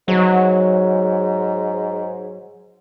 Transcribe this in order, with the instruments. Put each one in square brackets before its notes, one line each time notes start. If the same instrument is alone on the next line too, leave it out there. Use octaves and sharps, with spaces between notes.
[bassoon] G#2 [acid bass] F#3